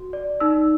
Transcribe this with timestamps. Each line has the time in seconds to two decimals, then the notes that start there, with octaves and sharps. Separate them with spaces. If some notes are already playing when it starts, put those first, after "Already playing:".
Already playing: F#4
0.13 D5
0.40 D#4 E6